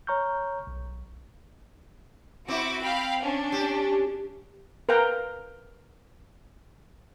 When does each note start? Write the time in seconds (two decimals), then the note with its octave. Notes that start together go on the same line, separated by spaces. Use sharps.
0.07 C#5 A#5 C#6 F6 G6
0.67 B1
2.48 C4 E4 F#4 D6
2.82 F5 G5 B5
3.22 C#4 D4
3.52 G4
4.89 A#4 B4 F5 G5 A#5